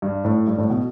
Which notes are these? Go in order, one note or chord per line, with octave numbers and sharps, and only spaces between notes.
G2
A2
G2
A2
B2